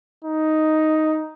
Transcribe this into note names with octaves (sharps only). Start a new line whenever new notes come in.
D#4